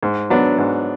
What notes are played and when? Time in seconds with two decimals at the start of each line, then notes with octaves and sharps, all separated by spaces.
0.03 G#2
0.30 F#3 B3 D4
0.58 G#2